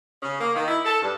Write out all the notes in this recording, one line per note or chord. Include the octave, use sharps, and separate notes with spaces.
C#3
A#3
D#3
E4
A4
G2